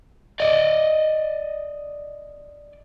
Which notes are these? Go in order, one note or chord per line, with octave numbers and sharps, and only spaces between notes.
D5 D#5